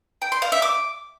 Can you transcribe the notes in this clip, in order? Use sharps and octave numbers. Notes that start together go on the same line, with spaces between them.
G5
C6
F5
E5
D6